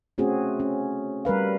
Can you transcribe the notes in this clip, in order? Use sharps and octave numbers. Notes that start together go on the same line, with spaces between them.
A3 C4 C#4 F#4 G#4
C#4
G3 A#4 B4 F5